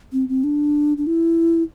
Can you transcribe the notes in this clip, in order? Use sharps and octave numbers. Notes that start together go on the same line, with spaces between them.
C4
C4
D4
D4
E4